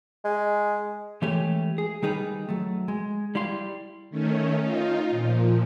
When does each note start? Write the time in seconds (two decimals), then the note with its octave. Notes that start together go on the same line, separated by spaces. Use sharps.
0.24 G#3
1.22 E3 G#3 A3 C#4 G4 C#5
1.78 G#4
2.02 D#3 G3 D#4 G#4 B4
2.49 F#3 A3
2.88 G#3
3.35 G3 E4 F5 C6
4.10 D#3 A3 C#4
4.59 D#4 F4
5.10 A#2 F3